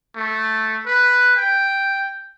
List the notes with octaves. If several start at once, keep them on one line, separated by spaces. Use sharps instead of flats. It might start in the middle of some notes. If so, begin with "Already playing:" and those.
A3
B4
G5